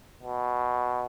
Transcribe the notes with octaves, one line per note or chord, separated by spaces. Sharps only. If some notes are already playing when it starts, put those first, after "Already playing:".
B2